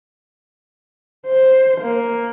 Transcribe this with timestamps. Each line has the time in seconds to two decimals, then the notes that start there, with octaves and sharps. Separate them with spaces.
1.27 C5
1.81 A#3